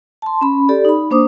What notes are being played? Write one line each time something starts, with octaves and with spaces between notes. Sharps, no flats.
A5 C6
C#4 B5
G4 A4 D5
D#4 B5
A#3 D4 C5 D6 D#6